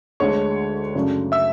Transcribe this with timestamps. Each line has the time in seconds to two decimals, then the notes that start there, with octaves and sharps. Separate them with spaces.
0.20 D2 D3 G#3 C#5 C#6
0.95 F#2 C#3 F#3 A3 D4
1.32 E5 E6